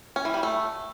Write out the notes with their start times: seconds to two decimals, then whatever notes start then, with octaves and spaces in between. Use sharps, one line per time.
0.16 C#4
0.25 E3
0.34 G3
0.43 A3